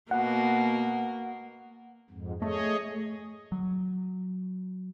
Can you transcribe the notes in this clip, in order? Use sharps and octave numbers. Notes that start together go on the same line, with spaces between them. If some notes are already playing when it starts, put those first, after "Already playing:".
B2 A#3 F#5
F2 G#2
A3 G#4 C#5 D#5
F#3